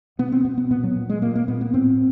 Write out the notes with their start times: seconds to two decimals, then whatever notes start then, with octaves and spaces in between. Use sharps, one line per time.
0.19 B2 B3
0.32 C4
0.45 B2 B3
0.58 B3
0.71 A#2 B3
0.84 F#3
0.96 A#2
1.10 G#3
1.22 A#2 A#3
1.35 A#3
1.48 A#2 B3
1.61 B3
1.74 A2 C4